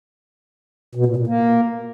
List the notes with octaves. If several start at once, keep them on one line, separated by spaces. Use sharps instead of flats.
B2
A#2
A#2
A#3